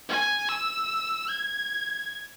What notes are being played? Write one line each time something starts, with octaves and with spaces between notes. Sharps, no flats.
G#5
E6
G#6